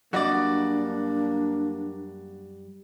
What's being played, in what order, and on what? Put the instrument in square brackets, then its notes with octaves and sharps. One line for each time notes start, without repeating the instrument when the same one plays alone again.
[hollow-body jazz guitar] F#2 G3 D#5 [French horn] A#3 [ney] D4 [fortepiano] F#4 D5